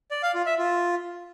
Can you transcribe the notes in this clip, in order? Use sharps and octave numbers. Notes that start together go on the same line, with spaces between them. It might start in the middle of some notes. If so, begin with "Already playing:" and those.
D5
F5
F4
E5
F4